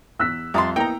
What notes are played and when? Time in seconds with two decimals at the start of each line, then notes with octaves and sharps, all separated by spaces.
0.19 E2 E6 F#6 B6
0.54 F2 G3 E5 A5 A#5 C6 D#6
0.76 A#3 B3 D#4 E4 G5 A#5